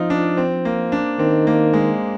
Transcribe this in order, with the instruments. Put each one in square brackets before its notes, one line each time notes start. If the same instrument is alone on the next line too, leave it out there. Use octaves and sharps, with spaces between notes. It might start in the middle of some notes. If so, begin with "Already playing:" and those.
Already playing: [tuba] F3 [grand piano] C4 D#4 F4
[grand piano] D4
C4
A#3
D4
[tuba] D#3 [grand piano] C4
[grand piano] A#3
G#3